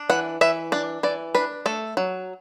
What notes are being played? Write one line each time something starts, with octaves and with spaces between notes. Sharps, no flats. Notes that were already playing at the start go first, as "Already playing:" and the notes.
Already playing: D4
E3 F#5
E3 E5
D4 D5
E3 D5
D4 B4
A3 A4
F#3